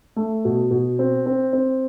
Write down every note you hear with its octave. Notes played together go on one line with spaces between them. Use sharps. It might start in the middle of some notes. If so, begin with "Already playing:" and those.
A3
B2
B2
C4
C4
C4